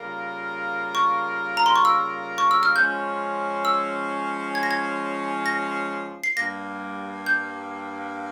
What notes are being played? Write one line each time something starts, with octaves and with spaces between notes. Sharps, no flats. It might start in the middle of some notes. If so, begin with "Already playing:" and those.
Already playing: C#3 G3 A#3 F4 A#4
C#6
A#5
C6
C#6
E6
C#6
E6
F6
F3 G#3 C#4 G6
E6
G#6
A#6
G#6
A#6
C7
G2 G3 A#3 A#6
G6